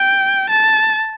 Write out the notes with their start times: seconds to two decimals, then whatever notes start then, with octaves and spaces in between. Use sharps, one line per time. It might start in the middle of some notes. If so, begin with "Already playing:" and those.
Already playing: G5
0.50 A5